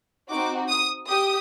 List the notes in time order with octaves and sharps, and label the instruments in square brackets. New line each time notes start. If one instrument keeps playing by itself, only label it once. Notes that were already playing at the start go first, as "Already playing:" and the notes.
[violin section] C4 D#4 F#4 D6
D#6
G4 D#6